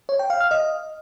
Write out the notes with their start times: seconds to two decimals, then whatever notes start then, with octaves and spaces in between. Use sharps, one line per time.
0.09 C#5
0.19 G5
0.30 F5
0.40 F6
0.51 D#5